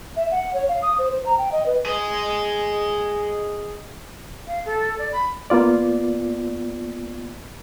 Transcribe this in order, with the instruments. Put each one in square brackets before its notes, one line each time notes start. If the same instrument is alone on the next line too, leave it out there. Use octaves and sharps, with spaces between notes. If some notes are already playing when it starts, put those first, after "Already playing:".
[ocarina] E5
F#5
C#5
F5
D#6
C5
C5
A#5
G5
D#5
B4
[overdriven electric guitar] G#4 D#5
[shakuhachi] F5
A4
D5
B5
[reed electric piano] A#3 B3 F4 D5